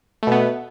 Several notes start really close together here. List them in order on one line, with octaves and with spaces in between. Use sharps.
A3 B2 B3